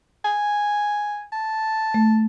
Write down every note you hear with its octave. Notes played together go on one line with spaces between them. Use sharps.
G#5
A5
A3